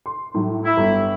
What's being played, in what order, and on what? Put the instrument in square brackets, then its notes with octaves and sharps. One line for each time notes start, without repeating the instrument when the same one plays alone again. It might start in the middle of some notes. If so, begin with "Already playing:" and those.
[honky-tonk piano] C6
A2 F#3
[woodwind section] E4
[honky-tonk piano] G1